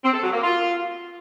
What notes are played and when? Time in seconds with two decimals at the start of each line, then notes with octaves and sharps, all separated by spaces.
0.03 C4
0.13 A4
0.23 F#3
0.33 A#3
0.42 F4